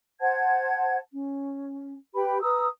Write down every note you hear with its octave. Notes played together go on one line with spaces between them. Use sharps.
C5 F#5 A5 G#6
C#4
G4 B4 G5 B5
B4 A#5 D#6 E6